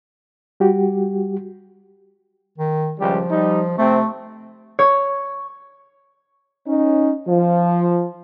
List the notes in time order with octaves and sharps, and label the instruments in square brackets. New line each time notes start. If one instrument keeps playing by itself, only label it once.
[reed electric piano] G3 F#4 G4
[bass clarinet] D#3
[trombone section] C#2 G3 G4 [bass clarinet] F3
[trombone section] G3 D#4
[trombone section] C3 C4 [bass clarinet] A3
[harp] C#5
[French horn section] C#4 D#4
F3